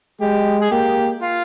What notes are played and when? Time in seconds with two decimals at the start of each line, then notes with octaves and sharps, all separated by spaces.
0.21 G#3 G4
0.62 G#4
0.72 A#3 G4
1.23 F4